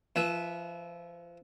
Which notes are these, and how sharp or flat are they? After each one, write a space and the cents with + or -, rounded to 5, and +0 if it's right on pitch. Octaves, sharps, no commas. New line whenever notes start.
F3 -25 B4 +0 E5 +0